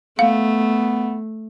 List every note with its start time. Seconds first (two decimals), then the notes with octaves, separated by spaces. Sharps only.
0.19 A3 B3 F5